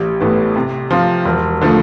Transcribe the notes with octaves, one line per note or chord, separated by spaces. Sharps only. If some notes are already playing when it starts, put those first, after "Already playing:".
Already playing: A1 G4
A2 E3 B3
C3
F3 C4 F4
E1
D3 F3 A3